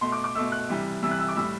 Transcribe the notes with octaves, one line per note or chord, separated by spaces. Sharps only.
B2 A3 C6
D6
D6
B2 A3 E6
F#6
C3 E3 G3
C3 E3 G3 E6
F#6
E6
D6
A2 G3 E6